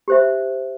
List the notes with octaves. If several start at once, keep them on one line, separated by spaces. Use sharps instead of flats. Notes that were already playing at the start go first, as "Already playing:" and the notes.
G4 C5 E5